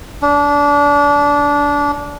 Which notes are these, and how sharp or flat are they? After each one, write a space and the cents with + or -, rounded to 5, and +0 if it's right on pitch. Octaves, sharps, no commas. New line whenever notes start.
D4 -25